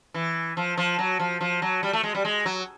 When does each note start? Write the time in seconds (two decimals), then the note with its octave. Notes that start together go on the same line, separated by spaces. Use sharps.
0.14 E3
0.57 F3
0.78 F3
0.99 F#3
1.20 F3
1.41 F3
1.62 F#3
1.83 G3
1.93 A3
2.03 G#3
2.15 G3
2.25 G#3
2.46 F#3